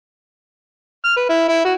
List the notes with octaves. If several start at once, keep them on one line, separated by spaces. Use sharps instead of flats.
F6
B4
E4
E4
F#4